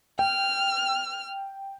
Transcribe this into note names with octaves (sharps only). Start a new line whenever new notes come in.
G5 F6